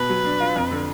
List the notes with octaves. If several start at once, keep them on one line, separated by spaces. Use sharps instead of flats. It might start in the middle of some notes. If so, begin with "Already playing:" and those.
Already playing: B2 B4
F#3
D4
F4
F2
D3